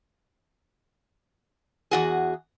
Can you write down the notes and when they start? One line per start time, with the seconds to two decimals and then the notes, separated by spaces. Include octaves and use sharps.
1.91 E2 F#4 G#4